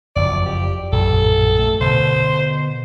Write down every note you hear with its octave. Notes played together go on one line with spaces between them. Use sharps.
F#1 F2 F3 D5
G4
A#1 F#2 A2 A4
A3
B2 D3 C5